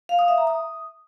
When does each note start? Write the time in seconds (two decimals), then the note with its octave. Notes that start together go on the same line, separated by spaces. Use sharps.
0.09 F5
0.19 D#6
0.28 E5
0.38 A#5
0.47 D#6